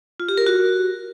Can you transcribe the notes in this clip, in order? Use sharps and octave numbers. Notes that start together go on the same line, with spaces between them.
F4
G4
A#4
F#4